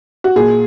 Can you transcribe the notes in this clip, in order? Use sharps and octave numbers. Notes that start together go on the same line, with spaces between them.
F#4
A#2 G#4